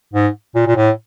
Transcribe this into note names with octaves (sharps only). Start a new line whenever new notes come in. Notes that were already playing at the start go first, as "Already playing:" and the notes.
G#2
A#2
A#2
A2